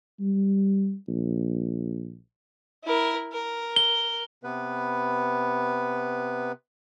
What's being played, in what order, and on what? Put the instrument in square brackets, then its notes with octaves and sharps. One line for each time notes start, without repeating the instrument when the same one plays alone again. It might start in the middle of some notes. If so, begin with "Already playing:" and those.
[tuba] G3
A#1
[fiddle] E4 A#4
A#4
[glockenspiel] G7
[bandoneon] C3 B3 B4